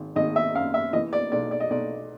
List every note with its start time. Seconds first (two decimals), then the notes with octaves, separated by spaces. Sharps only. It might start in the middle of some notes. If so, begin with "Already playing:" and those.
Already playing: G#1
0.16 G#1 D#5
0.36 E5
0.55 F#2 F5
0.74 E5
0.93 E3 D#5
1.13 D5
1.32 B1 D5
1.51 D5
1.60 D#5
1.70 B1 D5